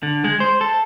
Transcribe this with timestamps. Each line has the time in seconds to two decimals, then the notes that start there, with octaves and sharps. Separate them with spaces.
0.03 D3
0.24 G#3
0.40 C5
0.61 A4